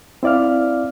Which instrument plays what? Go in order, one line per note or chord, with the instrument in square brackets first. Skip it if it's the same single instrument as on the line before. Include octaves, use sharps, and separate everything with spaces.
[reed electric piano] C4 E4 D5 F5 F6